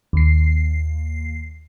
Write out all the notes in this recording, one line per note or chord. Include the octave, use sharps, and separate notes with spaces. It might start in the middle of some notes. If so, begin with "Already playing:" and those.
D#2 C7